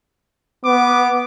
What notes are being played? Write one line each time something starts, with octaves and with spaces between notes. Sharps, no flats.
B3 D6